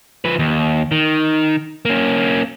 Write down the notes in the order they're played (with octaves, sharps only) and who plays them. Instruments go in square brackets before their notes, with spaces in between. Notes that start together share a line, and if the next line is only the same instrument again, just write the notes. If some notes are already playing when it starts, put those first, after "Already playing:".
[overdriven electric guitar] F3 B4
D#2
D#3
A#3 C#4